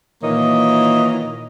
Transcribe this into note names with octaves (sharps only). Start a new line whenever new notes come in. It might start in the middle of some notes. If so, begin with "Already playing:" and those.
A#2 D#3 E3 A#3 C#5 D#5